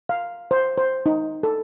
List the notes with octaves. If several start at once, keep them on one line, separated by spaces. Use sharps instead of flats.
F5
C5
C5
D#4
A4